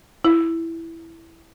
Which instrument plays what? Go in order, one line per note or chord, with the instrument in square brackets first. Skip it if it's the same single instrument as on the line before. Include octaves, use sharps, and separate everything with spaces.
[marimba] E4